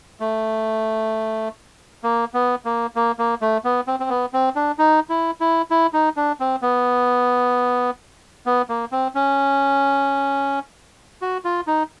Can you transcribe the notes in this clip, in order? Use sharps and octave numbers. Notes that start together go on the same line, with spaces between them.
A3
A#3
B3
A#3
A#3
A#3
A3
B3
C4
C4
B3
C4
D4
D#4
E4
E4
E4
D#4
D4
C4
B3
B3
A#3
C4
C#4
F#4
F4
D#4